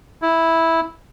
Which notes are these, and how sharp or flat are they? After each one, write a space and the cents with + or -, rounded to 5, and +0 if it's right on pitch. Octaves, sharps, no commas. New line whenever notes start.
E4 -5